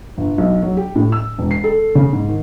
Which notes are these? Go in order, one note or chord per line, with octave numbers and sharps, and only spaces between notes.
G1
B1
F#3
G4
A2
E6
E1
C7
A4
C#3
G#2
D#3